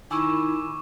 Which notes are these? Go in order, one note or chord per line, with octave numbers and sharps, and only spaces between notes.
D#3 E4 G#5 C#6 D6 E6